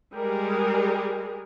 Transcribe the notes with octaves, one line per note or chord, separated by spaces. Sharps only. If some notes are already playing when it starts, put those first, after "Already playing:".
G3 G#3 G#4 A#4